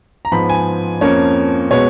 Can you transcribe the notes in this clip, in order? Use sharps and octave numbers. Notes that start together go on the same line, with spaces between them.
A#5
G#2 F3 B3 B5
G#5
F2 F3 A#3 C#4 C#5
B2 G#3 B3 C#5